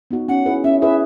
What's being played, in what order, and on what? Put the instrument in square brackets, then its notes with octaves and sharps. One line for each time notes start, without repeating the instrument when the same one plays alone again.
[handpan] B3 D#4 F#4
[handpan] C#4 [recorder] F#5
[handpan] E4 G#4 B4
[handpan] C#4 [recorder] E5
[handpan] E4 G#4 B4 [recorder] E5